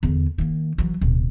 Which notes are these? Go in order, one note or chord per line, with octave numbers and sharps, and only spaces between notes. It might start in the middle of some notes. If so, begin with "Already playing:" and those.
E2 D3
D#3 A#3
E3 F#3
D1 B2